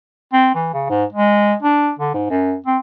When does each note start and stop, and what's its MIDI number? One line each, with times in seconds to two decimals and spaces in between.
0.33 0.52 60
0.55 0.73 52
0.74 0.90 49
0.90 1.05 44
1.13 1.54 56
1.63 1.91 62
1.99 2.14 50
2.14 2.30 44
2.30 2.54 42
2.67 2.78 60